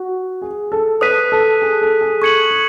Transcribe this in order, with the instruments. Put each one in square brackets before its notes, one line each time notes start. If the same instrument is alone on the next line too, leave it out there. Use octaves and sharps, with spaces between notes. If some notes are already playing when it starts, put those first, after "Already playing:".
Already playing: [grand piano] F#4
G#4
A4
[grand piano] B4 [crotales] D#6 F#6 B6 D#7
[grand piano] A4
G#4
A4
G#4
[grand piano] A4 [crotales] C#6 G#6 C#7 F#7
[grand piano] A4